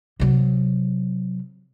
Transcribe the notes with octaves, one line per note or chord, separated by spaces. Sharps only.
C3 F#3